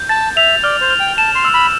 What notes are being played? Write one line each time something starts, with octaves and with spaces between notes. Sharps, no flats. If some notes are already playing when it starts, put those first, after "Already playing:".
Already playing: G6
A5 A6
E5 F7
D5 F6
C5
F6
G5
A5 E7
C6
E6
B5